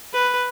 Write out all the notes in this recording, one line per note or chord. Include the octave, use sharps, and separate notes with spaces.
B4